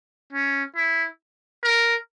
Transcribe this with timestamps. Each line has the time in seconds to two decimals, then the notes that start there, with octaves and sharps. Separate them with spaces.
0.33 C#4
0.76 E4
1.64 A#4